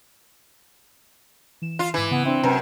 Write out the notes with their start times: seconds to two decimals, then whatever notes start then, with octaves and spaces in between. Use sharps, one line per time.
1.62 E3 E7
1.79 F4
1.94 G#2 E3 D6 G#6
2.11 C#3 B3
2.25 C4 D4 E5
2.44 F#2 C3 B4 D7